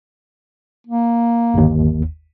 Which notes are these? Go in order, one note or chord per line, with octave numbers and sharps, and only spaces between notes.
A#3
G1 D#2